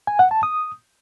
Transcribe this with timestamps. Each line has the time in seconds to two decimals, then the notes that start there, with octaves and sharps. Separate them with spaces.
0.07 G#5
0.19 F#5
0.31 A5
0.43 D#6